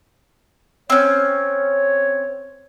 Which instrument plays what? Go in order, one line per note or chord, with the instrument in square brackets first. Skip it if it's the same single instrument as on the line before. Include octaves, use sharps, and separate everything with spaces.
[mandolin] C4 C#4 [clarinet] C#5